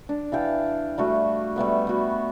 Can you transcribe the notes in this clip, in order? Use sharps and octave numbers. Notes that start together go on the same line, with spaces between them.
D4
E3 F5 G5 A5
G3 A3 F#4
G3 A3 B3 E5
B3 F#4